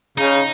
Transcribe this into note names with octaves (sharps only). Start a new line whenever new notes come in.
C#3 D#4